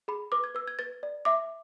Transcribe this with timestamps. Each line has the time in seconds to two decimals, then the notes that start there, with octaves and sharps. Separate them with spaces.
0.08 G#4 B5
0.32 B4 D6
0.44 G#6
0.55 B4 E6
0.68 G#6
0.79 B4 A6
1.03 D5
1.25 E5 D6